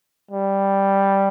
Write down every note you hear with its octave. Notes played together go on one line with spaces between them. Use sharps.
G3